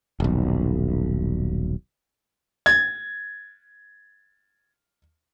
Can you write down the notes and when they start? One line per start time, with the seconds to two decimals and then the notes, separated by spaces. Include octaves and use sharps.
0.20 D#1 B1
2.66 G#6 A6